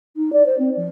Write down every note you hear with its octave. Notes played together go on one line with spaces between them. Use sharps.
D#4
D5
C5
C4
F3